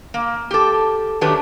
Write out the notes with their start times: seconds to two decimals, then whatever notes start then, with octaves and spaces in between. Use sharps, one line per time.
0.14 A#3
0.51 G4 A4
1.21 D#3 F#3 A3 D4 G4 B4